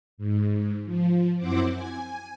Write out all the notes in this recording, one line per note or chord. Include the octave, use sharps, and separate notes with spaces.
G#2
F3
F#2 C4 E4 C5 F#5 D6
G#5